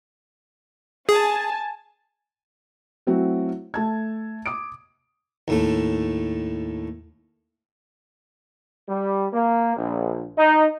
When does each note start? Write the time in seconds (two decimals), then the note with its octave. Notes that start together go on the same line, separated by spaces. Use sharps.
1.09 G#4 G#5 A5
3.07 F#3 A3 C4 E4 F#4
3.74 A3 A5 G#6
4.46 D6 D#6 D7
5.48 D#2 A2 A3
8.88 G3
9.33 A#3
9.77 A#1
10.37 D#4